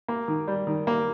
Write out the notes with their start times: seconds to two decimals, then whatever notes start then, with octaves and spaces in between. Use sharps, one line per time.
0.08 A#3
0.28 D#3
0.48 G3
0.67 D#3
0.87 A#3